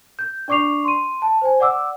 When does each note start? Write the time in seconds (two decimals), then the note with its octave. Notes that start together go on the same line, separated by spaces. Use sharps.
0.19 G6
0.48 D4 D5 C#6 D6 C7 F7
0.85 C6 D#7
1.22 A5
1.41 C5 G#5
1.60 D5 F#5 D6 E6